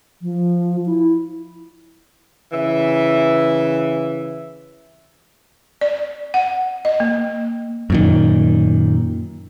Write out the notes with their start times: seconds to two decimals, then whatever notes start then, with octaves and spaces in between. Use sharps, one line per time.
0.22 F3
0.86 E4
2.53 C#3 E3 E5
5.81 D5
6.34 F#5
6.85 D#5
7.00 A#3
7.90 F#2 A#2 D#3